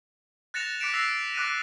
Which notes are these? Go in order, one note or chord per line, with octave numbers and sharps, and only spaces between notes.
F#6 A6 A#6 C#7 E7 F7
D6 F#6 B6 C#7 D7 E7
E6 A#6 C7 F7
D6 F#6 A#6 D#7